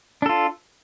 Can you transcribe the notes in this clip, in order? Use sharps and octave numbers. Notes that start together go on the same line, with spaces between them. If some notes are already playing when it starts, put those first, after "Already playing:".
D4 F4 A4